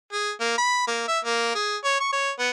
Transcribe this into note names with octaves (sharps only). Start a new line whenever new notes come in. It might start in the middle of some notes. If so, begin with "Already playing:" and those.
G#4
A#3
B5
A#3
E5
A#3
G#4
C#5
C#6
C#5
B3